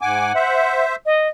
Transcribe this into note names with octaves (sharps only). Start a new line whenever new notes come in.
G#2 F#5 G#5 D6
C5 E5
D#5